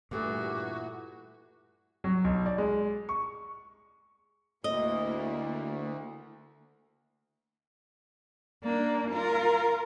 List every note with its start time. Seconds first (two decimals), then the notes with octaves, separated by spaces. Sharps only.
0.11 G2 A#2 E3 A3 F#4 G4
2.04 F#3
2.24 B1
2.46 D5
2.58 G#3
3.09 C#6
4.64 D2 A#3 E4 D#5
8.64 A#3 D4
9.11 F4 A#4